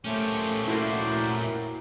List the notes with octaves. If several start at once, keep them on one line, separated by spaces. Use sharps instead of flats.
A#2 A3 C#4 G4 C5
E4 F#4 A#4 C5 D5 G5